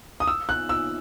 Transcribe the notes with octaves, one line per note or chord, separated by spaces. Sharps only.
D#6
E6
F#6
E6